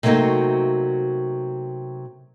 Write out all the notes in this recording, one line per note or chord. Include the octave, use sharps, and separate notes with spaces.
C3 F#3 A3 A#3 D#4 F#4